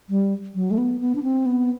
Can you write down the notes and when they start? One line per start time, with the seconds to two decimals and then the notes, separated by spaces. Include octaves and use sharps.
0.10 G3
0.55 F#3
0.71 A3
0.78 B3
1.00 B3
1.15 D4
1.23 C4
1.46 B3